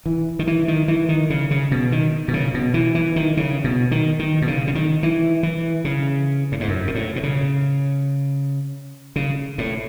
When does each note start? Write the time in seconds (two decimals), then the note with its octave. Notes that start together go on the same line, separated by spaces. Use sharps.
0.06 E3
0.39 D#3
0.47 E3
0.68 D#3
0.88 E3
1.09 D#3
1.30 C#3
1.51 C#3
1.72 B2
1.92 D#3
2.28 B2
2.34 C#3
2.54 B2
2.74 E3
2.95 E3
3.16 D#3
3.37 C#3
3.64 B2
3.91 D#3
4.19 D#3
4.42 B2
4.47 C#3
4.67 C#3
4.75 D#3
5.03 E3
5.43 E3
5.85 C#3
6.52 A2
6.60 G#2
6.68 F#2
6.87 B2
6.95 A2
7.16 B2
7.23 C#3
9.16 C#3
9.58 A2